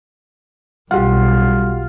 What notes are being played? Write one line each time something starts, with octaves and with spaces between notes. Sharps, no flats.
B1 G3 F4 G4 F#5